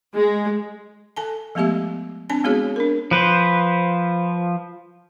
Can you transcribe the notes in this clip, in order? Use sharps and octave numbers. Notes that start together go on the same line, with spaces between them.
G#3
A4 G#5 A5
F3 G#3 A3 B3 G4 E5
C4 D4 G#5 A5
G#3 B3 F#4 G#4 C#5
D4 A#4
F3 B4 C5